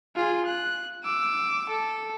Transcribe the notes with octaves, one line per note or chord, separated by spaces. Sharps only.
F4 G#4
F#6
D6 E6
A4